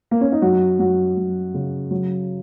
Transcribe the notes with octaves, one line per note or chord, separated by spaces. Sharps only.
A#3
C#4
D#4
F#2 F#4
F#2 F#4
F#2
C#3
F#3